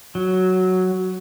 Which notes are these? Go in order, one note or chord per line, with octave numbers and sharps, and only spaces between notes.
F#3